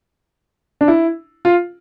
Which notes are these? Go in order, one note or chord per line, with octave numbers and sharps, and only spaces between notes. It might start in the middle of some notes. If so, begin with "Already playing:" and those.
D4
E4
F4